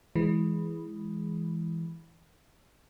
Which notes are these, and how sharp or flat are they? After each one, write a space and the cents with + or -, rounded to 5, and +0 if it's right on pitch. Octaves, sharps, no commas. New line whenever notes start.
E3 +0 G#3 +0